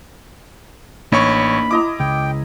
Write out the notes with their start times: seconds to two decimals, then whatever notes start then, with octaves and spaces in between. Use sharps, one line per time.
1.12 A1 A#3 D4 D#4 C#5 B5 C#6
1.71 E4 D#5 A#5 D6
2.00 C#2 G5